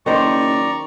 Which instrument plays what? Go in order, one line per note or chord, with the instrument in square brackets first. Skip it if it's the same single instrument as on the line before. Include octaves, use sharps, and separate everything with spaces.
[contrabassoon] F#1 [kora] D#3 C5 [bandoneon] D5 A#5 [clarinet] C#6